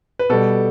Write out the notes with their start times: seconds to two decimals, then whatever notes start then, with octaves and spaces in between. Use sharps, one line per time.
0.19 B4
0.30 B2 G3 A4